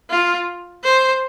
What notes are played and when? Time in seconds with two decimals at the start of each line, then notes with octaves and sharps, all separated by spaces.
0.10 F4
0.84 C5